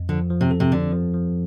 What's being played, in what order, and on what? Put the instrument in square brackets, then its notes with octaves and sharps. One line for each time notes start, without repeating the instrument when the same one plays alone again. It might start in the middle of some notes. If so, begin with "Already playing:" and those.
Already playing: [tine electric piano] F2
[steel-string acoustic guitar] D3 [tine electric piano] F3
[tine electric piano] F3
[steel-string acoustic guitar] C3
[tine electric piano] A4
[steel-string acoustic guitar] C3
[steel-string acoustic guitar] D3 [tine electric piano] C4
[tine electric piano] F3
F3